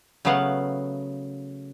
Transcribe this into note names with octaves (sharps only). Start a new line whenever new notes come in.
C#3 F#3 A3 B3 F5 F#5